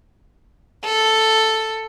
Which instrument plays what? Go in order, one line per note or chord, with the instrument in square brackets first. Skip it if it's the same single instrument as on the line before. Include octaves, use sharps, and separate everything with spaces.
[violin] A4